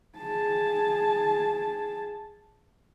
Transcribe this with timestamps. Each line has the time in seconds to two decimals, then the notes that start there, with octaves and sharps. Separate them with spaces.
0.18 G#4 A5